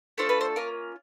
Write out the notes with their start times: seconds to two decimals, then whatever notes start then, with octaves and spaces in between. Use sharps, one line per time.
0.18 A3 D4 F4 A4 C5
0.29 B4
0.41 C5
0.56 A#3 C#4 F4 A#4